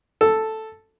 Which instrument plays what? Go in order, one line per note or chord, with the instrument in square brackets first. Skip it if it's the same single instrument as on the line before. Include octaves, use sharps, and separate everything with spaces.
[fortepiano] A4